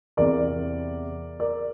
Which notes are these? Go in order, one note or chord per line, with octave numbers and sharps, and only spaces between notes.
E2 C3 E3 A#4 D5
A#4 D5